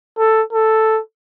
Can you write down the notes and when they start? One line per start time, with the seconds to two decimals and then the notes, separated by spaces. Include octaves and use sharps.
0.19 A4
0.53 A4